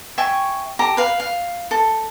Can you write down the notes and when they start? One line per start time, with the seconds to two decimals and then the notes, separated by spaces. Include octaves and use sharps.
0.18 E5 G5 G#5 C#6
0.79 G4 A4 A#5
0.97 B4 F5
1.20 F5
1.71 A4